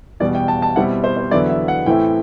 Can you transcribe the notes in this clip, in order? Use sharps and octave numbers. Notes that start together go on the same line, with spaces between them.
E2 B2 G3 D5
G5
A5
A5
B2 G3 C4 E4 F#5
C5
C5
E2 D3 F#3 B3 E4 D5
E5
F#5
A2 E3 A3 C4 E4 G5